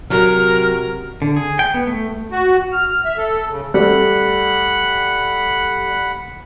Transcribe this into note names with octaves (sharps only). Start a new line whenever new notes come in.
C3 F#3 A#4 F6
D3
G#4
G5
B3
A3
F#4
F6
E5
A4
C#3
G3 A3 F#5 B5 F#6